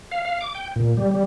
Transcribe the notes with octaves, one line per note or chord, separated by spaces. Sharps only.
F5
F5
D6
G5
A#2
G3
G3